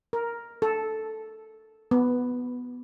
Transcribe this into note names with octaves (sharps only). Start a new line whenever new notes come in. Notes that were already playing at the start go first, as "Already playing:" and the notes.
A#4
A4
B3